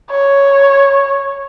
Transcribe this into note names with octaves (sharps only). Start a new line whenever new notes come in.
C#5